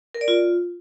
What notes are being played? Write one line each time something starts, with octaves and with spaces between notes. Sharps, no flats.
A#4
D5
F4